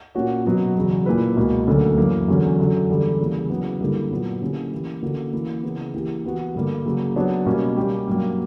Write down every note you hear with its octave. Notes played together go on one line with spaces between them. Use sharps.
A#2 A#3 C#4 F#4 C#5
B2 F#3 B3 F#4
E2 C#3 F#3
A#2 A#3 E4 B4
C#2 B2 A#3
D2 D3 F#3 A#3 C#4
F#2 E3 A#3
E2 D3 F#3 C#4
F#2 D3 F#3
E2 D3 G3
C#3 E3 G3 A#3 E4
C#3 F#3 B3 E4
G2 D3 G3 A#3 E4
A#2 F#3 B3
D3 A#3 C#4 E4 G4
E3 A#3 E4 G4
D3 A#3 C#4 F#4
E3 A#3 E4
C#3 E3 B3
E3 A#3 E4 G4
E3 B3 F#4
G2 D3 G3 A#3
C#3 F#3 A#3
F#3 B3 D4 F#4 C#5
B2 G3 A#3 C#4
G3 A#3 C#4 G4
G2 F#3 A#3